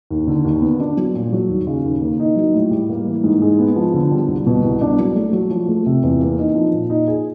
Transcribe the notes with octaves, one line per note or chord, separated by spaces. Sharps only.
D#2
D3
D#2
B3
D4
F#3
A#2
F#3
D#2
C#3
D#2
A#3
D#4
F#3
A2
G3
A#3
E3
G#2
G#3
B3
F3
D3
G3
C2
B2
C2
D4
F#3
A3
F#3
F3
A3
C3
E2
A#3
D#4
F3
A#2
D#4
G#4